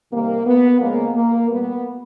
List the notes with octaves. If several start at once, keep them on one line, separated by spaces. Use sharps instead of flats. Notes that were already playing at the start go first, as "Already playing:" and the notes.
C3 D#3 G3 A#3
B3
C#3 F3 G#3 A#3
A#3
A#2 G3 B3